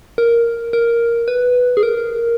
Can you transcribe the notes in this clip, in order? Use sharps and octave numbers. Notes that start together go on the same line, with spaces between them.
A#4
A#4
B4
G#4
A#4